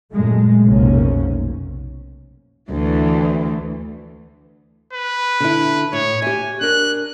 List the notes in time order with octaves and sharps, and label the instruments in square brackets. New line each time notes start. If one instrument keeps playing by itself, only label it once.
[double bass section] F#2 A#2 G#3 A3
F1 B1 F#2 C3 A#3 C#4
[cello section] D2 E3
[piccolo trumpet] B4
[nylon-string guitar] D3 E4
[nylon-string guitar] A2 [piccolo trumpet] C#5
[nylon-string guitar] G4 E5 [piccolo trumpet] G#5
[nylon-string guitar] D4 A#4 [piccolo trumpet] F#6